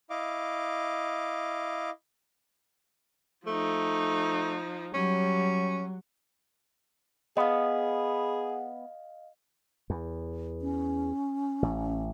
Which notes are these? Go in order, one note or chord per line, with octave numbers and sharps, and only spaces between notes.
E4 D#5 F5 D6
F3 A3 D#4
F#3 G3 C#4
B3 G#4 D#5 F5
E2
C#4
A1